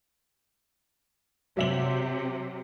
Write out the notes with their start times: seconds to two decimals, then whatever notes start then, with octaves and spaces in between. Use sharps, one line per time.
1.57 C3 F#3 E5 F#7